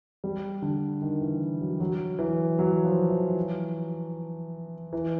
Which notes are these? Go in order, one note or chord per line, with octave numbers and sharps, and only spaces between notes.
G3
D3
D#3
E3
F#3
F#3
E3
F#3
F3
E3
E3